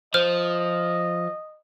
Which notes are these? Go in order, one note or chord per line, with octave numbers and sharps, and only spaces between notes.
F3 C5 D#5 F6